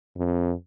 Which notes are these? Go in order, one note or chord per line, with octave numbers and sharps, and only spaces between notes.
F2